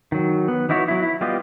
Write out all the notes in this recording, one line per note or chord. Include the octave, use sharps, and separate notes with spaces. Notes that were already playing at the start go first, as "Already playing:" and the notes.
D#3 F#3
B3
E3 D#4 E4 F#4 C#5
F#3 E4
E4
G3 B3 F4 G4 D#5